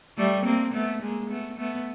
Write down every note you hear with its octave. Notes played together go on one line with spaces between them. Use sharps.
G3 A3
A#3 C4
A3 B3
G#3 A#3
A3 B3
A3 B3